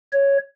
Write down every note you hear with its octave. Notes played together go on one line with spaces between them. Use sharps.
C#5